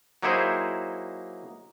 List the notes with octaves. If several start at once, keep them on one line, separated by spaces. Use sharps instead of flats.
F#3 A#3 D#4 E4 G#4 C5